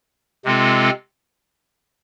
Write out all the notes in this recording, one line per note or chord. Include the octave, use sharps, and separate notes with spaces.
C3 G#3 C4 F4 A4